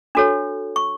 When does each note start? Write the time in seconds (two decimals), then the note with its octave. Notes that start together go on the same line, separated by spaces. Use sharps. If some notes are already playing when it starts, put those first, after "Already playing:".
0.15 D4 F#4 A4 C#5
0.76 C#6